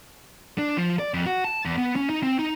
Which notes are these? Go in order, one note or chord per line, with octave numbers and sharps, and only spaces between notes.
D4
F3
D5
F2
F#4
A5
E2
B3
C#4
D#4
C4
D#4